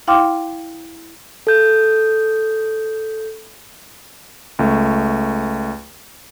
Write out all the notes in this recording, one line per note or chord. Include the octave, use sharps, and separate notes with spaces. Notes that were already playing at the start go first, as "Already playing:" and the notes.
E4 F5 G5 C6 D6 F6
A4 G6
C#2 A3